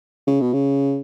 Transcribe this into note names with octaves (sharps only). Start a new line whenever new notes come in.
C#3
B2
C#3